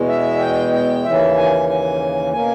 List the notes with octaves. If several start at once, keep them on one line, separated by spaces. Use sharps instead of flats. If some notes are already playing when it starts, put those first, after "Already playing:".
Already playing: E2 B2 G#3
E5
G5
G5
D#2 C#3 E3 E5
G#5
G#5
B2 A#3 C#4 G#5